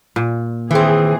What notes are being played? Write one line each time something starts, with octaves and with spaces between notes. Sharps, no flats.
A#2
D#3 E3 C4 G#4